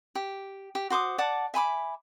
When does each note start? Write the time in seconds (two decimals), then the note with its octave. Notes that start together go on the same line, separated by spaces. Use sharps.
0.15 G4
0.75 G4
0.90 F#4 C5 D6 D#6
1.18 D5 F#5 A5 D6
1.54 E5 G#5 B5 D6